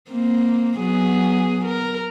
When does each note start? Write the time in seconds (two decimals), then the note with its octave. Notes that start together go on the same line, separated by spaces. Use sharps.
0.11 A#3 C4
0.78 F#3 B3 G#4
1.65 A#4